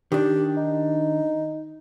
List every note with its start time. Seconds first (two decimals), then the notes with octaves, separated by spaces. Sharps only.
0.12 D#3 D4 G4
0.57 D#4